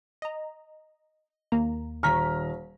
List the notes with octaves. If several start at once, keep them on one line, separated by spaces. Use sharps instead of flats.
D#5 A#5
D#2 A#3 A#5
D#1 A#5 C#6 F6 B6